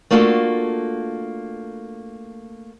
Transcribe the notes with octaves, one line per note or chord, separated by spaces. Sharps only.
A3 A#3 D4 F4 F#4 A4